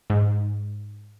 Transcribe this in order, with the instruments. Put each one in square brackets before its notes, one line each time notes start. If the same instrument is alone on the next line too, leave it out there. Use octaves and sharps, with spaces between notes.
[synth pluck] G#2